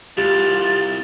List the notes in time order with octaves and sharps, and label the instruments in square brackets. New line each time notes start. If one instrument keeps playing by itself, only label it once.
[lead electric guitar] C2 [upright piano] G3 [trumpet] F4 [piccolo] A6